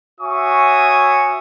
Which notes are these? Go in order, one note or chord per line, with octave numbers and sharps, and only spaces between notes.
F#4 C#5 E5 G#5 C#6 D#6